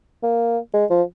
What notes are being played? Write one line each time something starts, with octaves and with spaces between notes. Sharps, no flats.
A#3
G#3
F3